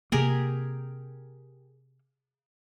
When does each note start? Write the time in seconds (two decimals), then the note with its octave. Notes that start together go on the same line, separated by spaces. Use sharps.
0.12 C3 A#3 G4 G#4 A#4